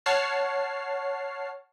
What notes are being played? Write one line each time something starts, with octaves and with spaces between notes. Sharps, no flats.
C#5 F#5 A5 F6 C7